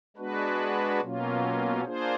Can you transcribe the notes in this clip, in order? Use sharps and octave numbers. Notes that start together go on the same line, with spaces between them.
G#3 B3 D4 F#4 B4
B2 F#3 A#3 C#4 F4
A#3 D4 F4 G#4 C5